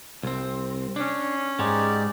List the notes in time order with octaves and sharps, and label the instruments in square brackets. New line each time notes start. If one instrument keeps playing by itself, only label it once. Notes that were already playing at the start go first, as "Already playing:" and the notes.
[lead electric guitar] C2 C4
[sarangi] C#4 [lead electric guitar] D4
[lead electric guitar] G#2 G#3 [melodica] D#4 G4 D5